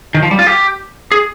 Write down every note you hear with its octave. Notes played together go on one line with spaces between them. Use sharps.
D#3
F3
G3
F4
G4
G#4